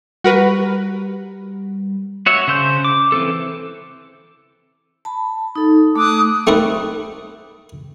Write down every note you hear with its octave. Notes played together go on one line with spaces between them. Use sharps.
G3 F#4 A#4 B4
F#4 C#5 E5
C#3 C5 G6
D6
E3 C4 A4
A5 B5
D#4 A4
A3 D6 D#6 F#6
A3 C4 D#4 E4 A#4